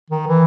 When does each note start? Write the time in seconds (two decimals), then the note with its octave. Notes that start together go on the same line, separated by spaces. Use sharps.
0.11 D#3
0.28 E3